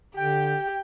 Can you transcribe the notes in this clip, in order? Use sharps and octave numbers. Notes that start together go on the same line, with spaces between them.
D3 G4 G5